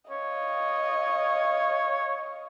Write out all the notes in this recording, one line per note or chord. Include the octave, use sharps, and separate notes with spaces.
C#5 D#5 F5